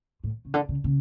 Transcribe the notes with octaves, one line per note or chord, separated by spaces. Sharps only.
A2
C#3
D3
C#3
C#3